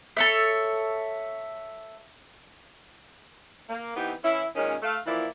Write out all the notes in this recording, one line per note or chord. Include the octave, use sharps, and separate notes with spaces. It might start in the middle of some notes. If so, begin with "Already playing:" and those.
A4 C#5 E5
A#3
E3 B3 C4 D#4 G4
E3 C#4 E4
A#2 D#3 G#3 C#4
A3 F5
E3 F3 A#3 E4 D5